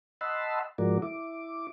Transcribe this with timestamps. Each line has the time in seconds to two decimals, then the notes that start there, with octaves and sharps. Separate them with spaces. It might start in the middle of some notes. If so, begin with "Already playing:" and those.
0.21 D#5 F#5 A5 B5 C6 E6
0.78 G#2 F3 G#3 F#4 A#4 D5
1.02 E4 D6